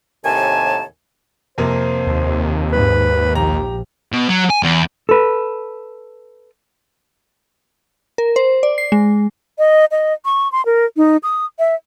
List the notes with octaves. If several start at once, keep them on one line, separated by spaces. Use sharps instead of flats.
D#2 A2 C3 D#3 G#5 A5
F2 C3 A#3 C5
D#2
G#2 B4
A#1 G4 A#5
B2
F#3
G#5
E2
A4 B4
A#4
C5
D5
C7
G#3
D#5
D#5
C#6
C6
A#4
D#4
D#6
E5